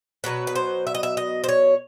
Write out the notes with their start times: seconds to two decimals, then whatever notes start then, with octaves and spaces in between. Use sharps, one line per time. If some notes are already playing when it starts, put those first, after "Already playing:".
0.24 B2 F#3 B3 B4
0.47 B4
0.55 C5
0.87 E5
0.95 D#5
1.03 E5
1.17 D#5
1.44 C5
1.49 C#5